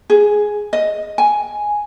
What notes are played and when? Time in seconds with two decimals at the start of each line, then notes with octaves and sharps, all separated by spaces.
0.10 G#4
0.73 D#5
1.18 G#5